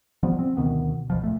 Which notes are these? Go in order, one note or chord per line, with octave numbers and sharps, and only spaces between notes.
F3 G3 B3
C4
D2 B2 D#3 B3
C#2 B2 F3
A#2 A3